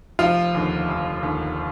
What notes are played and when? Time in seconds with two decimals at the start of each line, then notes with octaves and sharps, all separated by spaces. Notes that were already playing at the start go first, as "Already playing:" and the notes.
0.19 F1 F3 F4
0.54 D#2 D3
0.89 F1
1.23 D#2 D3